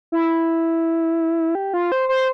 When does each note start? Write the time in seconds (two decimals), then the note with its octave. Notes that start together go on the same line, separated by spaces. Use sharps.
0.12 E4
1.55 G4
1.74 F4
1.92 C5
2.09 C5